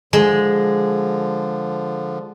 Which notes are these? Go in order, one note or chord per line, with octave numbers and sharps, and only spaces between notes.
D3 F3 G#3